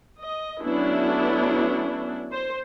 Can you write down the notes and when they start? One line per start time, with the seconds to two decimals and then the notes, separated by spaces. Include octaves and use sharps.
0.20 D#5
0.63 F#3 A3 B3 C#4 D4 E4
2.32 C5